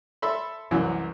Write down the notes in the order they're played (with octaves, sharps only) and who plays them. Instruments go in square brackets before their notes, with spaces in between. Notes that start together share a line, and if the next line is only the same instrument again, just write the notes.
[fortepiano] A4 E5 B5 C6
C2 F#2 E3 F#3